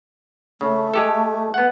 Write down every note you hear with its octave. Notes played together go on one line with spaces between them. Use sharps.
C#3 A3
G#3 G4 A4
B3 F#5